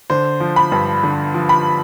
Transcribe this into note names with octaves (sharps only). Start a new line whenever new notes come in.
D3 C5
F3
B5
G2
D3
F3
B5